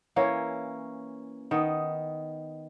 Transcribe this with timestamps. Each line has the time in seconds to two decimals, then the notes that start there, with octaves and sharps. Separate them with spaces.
0.16 E3 A#3 C#4 C#5
1.51 D#3 B3 D#5